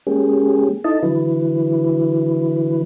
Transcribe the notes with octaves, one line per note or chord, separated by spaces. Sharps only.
G#3 A#3 C#4 G4 G#4
D#4 E4 A4 D#5 A5
D3 E3 F#3 E4 B4